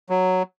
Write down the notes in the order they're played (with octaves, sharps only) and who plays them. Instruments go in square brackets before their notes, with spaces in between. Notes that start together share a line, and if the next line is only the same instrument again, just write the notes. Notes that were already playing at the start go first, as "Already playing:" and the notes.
[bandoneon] F#3